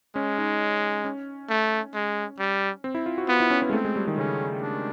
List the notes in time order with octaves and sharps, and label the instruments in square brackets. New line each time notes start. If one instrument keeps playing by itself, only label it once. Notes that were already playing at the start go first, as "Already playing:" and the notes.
[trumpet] G#3 [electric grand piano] C#4
[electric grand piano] D#4
C#4
[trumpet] A3
G#3
G3
[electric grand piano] C4
E4
F4
F#4
[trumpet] B3 [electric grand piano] F4
[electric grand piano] E4
C#4
B3
G#3
[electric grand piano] A3 [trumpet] C4
[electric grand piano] G#3
G3
D#3
[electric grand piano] C#3 [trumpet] C#4
[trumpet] D4